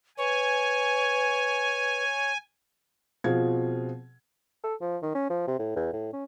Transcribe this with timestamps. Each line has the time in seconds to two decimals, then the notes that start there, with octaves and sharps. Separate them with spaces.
0.18 B4 C#5 G#5
3.24 B2 F3 C4 F4 G#4 G#6
4.64 A4
4.81 F3
5.02 D#3
5.15 C#4
5.30 F3
5.48 C3
5.59 A2
5.76 E2
5.93 A2
6.13 C#4